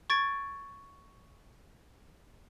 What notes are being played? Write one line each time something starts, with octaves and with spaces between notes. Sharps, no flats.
C#6 G#6 A6 D7